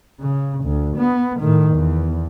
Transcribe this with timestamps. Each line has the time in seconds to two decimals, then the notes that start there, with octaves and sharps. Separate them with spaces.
0.20 C#3
0.64 D2
0.98 B3
1.40 A2 D#3
1.74 E2